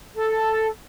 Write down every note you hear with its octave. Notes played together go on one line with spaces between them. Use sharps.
A4